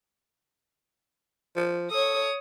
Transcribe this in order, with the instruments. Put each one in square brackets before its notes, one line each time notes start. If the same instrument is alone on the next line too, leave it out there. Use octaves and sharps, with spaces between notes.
[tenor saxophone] F3
[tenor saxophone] A4 [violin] C#5 D#6